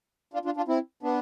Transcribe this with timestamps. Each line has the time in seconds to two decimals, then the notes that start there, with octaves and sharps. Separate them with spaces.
0.33 D4 F4
0.45 D4 F4
0.57 D4 F4
0.68 C4 E4
1.03 B3 D4